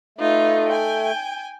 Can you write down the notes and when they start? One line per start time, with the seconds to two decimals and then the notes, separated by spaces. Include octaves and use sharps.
0.18 A3 D#4 F4 B4
0.67 G5 G#5